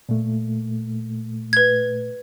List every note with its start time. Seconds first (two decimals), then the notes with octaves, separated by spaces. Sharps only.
0.09 A#2 A3
1.53 B4 G#6